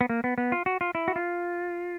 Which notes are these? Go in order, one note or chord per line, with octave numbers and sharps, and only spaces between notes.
B3
A#3
B3
B3
F4
F#4
F4
E4
F#4
F4